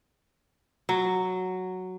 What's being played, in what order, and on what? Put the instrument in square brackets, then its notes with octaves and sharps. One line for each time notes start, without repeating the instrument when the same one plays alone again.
[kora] F#3